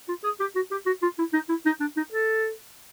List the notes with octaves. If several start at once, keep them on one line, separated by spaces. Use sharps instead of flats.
F4
G#4
G4
F#4
G4
F#4
F4
E4
D#4
E4
D#4
D4
D#4
A4